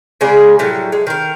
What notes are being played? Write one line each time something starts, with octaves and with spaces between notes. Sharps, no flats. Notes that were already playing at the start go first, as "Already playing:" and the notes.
C#3 G#3 G#4 D5
A2 F#3 G3
G#3
D#3 A#4